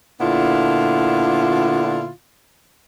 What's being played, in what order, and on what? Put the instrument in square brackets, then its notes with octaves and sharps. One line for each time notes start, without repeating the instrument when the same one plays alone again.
[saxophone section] A#2 D3 B3 D4 E4 F4